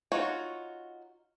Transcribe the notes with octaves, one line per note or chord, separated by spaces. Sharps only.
D#4 F4 F#4 C#5